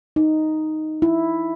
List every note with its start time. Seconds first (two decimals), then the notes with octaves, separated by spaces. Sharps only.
0.16 D#4
1.02 E4